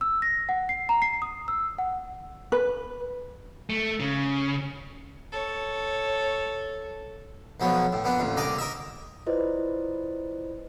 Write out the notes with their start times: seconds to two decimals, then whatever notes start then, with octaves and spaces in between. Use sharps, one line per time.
0.01 E6
0.22 A#6
0.49 F#5
0.69 C7
0.89 A#5
1.02 C7
1.22 D#6
1.48 E6
1.78 F#5
2.52 B4
3.70 A3
4.00 C#3
5.32 A4 C#5
7.60 B1 F3 F#3 B3
7.93 A2
8.04 A#2 B3 D4
8.20 A1 D2 A#2
8.37 C2 D3 D5 A#5 D6 D#6
8.58 A#4 D#5 E5
9.26 E4 F4 B4 C5 D5 D#5